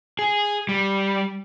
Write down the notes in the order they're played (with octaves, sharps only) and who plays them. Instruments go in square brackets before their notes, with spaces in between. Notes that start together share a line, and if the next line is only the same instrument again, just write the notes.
[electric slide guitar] G#4
G3